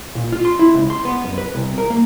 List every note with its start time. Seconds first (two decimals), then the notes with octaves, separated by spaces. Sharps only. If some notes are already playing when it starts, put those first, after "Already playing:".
0.15 A#2
0.32 F4
0.45 C6
0.59 E4
0.74 C#2
0.90 C6
1.05 B3
1.24 F#2
1.38 B4
1.55 C2
1.78 A#4
1.90 A#3